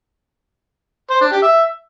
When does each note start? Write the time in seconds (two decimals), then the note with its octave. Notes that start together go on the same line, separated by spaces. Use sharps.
1.10 C5
1.21 D4
1.32 G4
1.43 E5